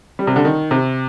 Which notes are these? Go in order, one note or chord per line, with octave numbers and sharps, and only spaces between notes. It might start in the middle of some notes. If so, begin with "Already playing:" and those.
G3
C3
D3
D#3
C3